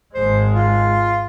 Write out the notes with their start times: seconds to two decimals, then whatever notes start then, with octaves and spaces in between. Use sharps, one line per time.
0.15 G#1 G#3 C5
0.55 F4